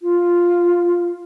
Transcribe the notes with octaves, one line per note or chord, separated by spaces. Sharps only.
F4